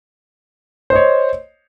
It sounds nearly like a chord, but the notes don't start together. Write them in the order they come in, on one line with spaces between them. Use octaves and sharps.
C5 D#5 C#5